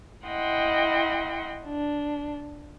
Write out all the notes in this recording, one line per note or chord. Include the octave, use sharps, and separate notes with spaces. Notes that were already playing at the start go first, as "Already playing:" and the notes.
E4 D#5 F#5 G5 C6
D4